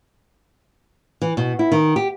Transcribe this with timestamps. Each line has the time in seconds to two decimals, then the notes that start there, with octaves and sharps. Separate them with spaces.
1.22 E3
1.37 B2
1.59 E4
1.72 D#3
1.96 G4